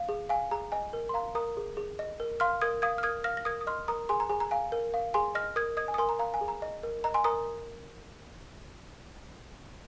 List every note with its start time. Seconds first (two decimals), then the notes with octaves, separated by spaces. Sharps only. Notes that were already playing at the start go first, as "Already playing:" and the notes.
Already playing: F5
0.09 G#4
0.29 F5 G#5
0.51 G#4 A#5
0.72 D#5 G#5
0.93 A#4
1.09 C6
1.14 F5 A#5
1.35 A#4 A#5 D#6
1.57 G#4
1.77 G#4
1.99 D#5
2.20 A#4
2.40 F5 C6 F6
2.61 A#4 D#6 G#6
2.82 F5 D#6 G#6
2.98 F6
3.03 A#4 D#6 G#6
3.24 F5 F6 A#6
3.37 A#6
3.45 A#4 D#6 G#6
3.61 D#6
3.67 D#5 C6 F6
3.88 A#4 A#5 D#6
4.09 G#4 G#5 C6
4.20 A#5
4.29 G#4 G#5
4.40 A#5
4.51 F5 G#5
4.72 A#4
4.94 F5
5.14 G#4 G#5 C6
5.35 D#5 F6 A#6
5.56 A#4 D#6 G#6
5.77 D#5 D#6 G#6
5.88 G#5
5.94 D#6
5.98 A#4 G#5 C6
6.09 A#5
6.19 F5 A#5
6.34 G#5
6.41 G#4
6.48 A#5
6.62 D#5
6.83 A#4
7.04 D#5 A#5
7.14 G#5 C6
7.24 A#4 A#5 D#6